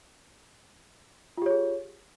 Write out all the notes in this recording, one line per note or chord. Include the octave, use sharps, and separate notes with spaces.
F4 G4 G#4 C#5